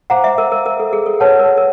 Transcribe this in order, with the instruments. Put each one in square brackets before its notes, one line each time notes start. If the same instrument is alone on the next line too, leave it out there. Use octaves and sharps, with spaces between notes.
[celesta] C5 F5 A#5 D6 [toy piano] F#5
[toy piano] E5
A#4
A#4
A#4
A4
G#4
A4
[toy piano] B4 [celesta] C#5 F#5 A5
[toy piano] A#4
A#4